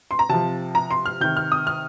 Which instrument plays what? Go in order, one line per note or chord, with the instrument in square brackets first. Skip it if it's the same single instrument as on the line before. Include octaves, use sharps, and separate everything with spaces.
[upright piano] C6
A#5
C3 F3 A5
A#5
C6
F6
C3 D#3 G6
F6
D#6
F6